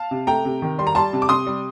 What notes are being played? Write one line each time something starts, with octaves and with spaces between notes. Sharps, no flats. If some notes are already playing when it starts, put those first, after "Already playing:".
Already playing: F5 A5
C3
A3 G5 A#5
C3
D#3
G3 C6
A#5
G3 A5 C6
C3
D6
C3 C6 D#6
G3